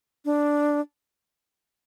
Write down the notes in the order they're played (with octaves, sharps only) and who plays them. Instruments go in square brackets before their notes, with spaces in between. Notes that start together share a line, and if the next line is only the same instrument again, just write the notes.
[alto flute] D4